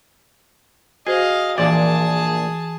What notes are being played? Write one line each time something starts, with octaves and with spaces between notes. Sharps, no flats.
F#4 G#4 C5 D#5 F5
A#1 A#2 E3 G#4 D5 A5